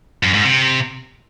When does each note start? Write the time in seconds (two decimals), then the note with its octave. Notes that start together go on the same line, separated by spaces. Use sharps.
0.23 F#2
0.34 G#2
0.45 C3